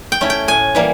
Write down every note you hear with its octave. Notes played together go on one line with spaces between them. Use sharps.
G5
A3 C#4 E4
G5
A2 G#5
E3 G3 A#3